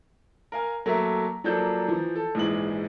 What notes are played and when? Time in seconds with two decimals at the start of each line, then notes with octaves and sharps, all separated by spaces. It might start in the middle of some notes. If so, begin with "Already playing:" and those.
0.52 A#4 F5 G#5
0.86 F#3 A3 A#3 A#4 E5
1.44 F3 F#3 A#3 D4 A4 G6
1.88 E3 F3
2.16 A4
2.35 A#1 G#2 E3 G#3 F#7